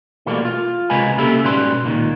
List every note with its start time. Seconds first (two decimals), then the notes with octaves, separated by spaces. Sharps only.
0.26 B2 E3 G3 A3 A#3
0.45 F4
0.90 C#2 C3 G#3 A#4 B4 G#5
1.18 C#3 A#3 E4 G4 A4
1.44 G#2 B2 G3 C#4 B4 C6
1.84 C#2 A#2 D#3